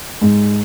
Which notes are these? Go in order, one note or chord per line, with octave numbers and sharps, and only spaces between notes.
G#2